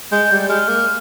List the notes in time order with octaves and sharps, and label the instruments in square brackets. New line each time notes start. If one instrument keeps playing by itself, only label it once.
[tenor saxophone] G#3 [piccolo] G6
[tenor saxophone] G3
[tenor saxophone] G#3 [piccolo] F6
[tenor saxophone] A#3